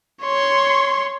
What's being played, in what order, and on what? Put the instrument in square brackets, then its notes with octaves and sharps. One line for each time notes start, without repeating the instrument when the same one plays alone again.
[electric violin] C#5 C6